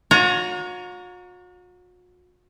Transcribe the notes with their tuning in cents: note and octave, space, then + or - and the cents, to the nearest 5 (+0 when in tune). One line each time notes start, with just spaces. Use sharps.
F#4 -45 C#5 +25 A#5 +0